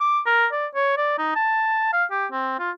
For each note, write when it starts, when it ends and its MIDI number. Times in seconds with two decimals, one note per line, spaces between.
0.01 0.19 86
0.26 0.46 70
0.52 0.66 74
0.75 0.97 73
0.97 1.17 74
1.19 1.34 63
1.36 1.91 81
1.93 2.04 77
2.11 2.26 67
2.31 2.58 60
2.59 2.71 65